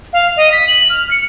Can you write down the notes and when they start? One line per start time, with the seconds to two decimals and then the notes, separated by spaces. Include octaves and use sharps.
0.13 F5
0.37 D#5
0.52 B6
0.68 F#7
0.90 F6
1.11 C#7